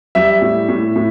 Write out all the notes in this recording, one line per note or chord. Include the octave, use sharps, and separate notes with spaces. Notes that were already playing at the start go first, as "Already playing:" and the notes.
G3 E5
A2
A2
A2